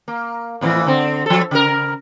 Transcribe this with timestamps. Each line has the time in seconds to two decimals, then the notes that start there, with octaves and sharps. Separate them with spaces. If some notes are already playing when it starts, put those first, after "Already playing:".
0.08 A#3
0.61 F2 A2 E3
0.86 D3 C4
1.26 F3 A4
1.51 C#3 A#4